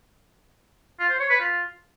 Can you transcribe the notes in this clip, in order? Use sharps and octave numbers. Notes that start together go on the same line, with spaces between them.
F4
C5
C#5
B4
F4